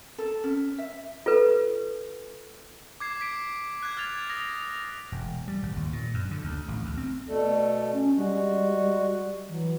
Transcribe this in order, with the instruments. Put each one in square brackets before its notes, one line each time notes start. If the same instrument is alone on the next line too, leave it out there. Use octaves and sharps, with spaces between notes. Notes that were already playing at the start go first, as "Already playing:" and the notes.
[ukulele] A4
C#4
E5
[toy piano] F4 A4 B4
[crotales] D6 G#6 C7
B6 D7
D6 F#6 G#6
F6 G#6 A6 F7
D#6 G#6 A#6
[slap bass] E1
G3
G#1
D#2
A#2
F#2
D3
D2
A1
D2
C4
[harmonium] B2 A3 A4 [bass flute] D5
[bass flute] C#4
[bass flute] G3 [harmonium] G#3 F#4
[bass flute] E3 [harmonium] F#3